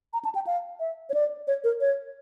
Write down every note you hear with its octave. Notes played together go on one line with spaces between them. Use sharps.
A#5
A5
G5
F5
E5
C#5
D5
C#5
A#4
C#5